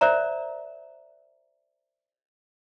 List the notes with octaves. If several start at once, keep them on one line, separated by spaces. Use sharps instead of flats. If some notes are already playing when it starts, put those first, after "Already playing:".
A#4 C5 D5 E5 A#5